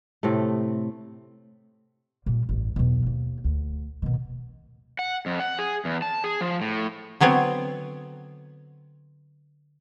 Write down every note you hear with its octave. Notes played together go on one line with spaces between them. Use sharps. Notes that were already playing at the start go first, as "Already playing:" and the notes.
A2 C3 A3
A#2 G3
A1 G2
B1 E2
D#2
D2
B2 D#3
F#5
F2
F#5
G#4
E2
A5
G#4
F3
A2
D3 F#3 B3 C4 C#5